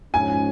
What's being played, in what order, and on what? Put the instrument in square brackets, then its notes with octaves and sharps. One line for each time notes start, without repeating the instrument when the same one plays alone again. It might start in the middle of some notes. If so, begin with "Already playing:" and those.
[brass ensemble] G#2 F3 G#3 C#4 [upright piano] G#5